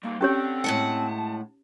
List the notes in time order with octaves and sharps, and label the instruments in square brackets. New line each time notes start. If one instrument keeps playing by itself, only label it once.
[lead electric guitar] G3 D#4 [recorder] A#3
[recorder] C4 [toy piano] C#4 G4 C#5 [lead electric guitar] A4 D5
[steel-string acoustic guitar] A2 G#3 F#5 [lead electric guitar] A5